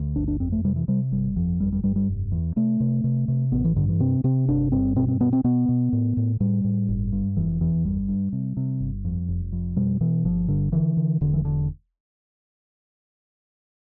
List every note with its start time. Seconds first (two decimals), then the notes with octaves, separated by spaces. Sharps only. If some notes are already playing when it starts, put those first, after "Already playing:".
Already playing: D2
0.16 G1 D4
0.28 D4
0.40 F2 C4
0.52 A3
0.64 C3 G3
0.76 E3
0.88 C3 G3
1.11 G1 G3
1.36 F2 F3
1.60 G1 G3
1.72 G3
1.84 G2 G3
1.96 G3
2.08 F1
2.32 E2
2.56 C3 A3
2.80 C3
3.04 C3
3.28 C3
3.52 A1 B3
3.65 E3
3.76 G2 D3
3.89 E3
4.00 C3 C4
4.24 C3 C4
4.48 G1 D4
4.72 G2 C4
4.96 B2 C4
5.08 C4
5.20 B2 B3
5.33 C4
5.44 B2 B3
5.69 B2
5.93 A2
6.17 A2
6.40 A2 G3
6.64 A2
6.89 G1
7.12 G2
7.37 F1 E3
7.60 E2 E3
7.85 G1 G3
8.08 G2
8.33 C3
8.57 C3
8.80 G1
9.05 F2
9.29 F1
9.52 F2
9.76 B2 G3
10.01 B2 E3
10.25 G1 F3
10.48 G2 D3
10.72 D3 E3
10.97 D3
11.21 E1 D3
11.34 E3
11.45 D3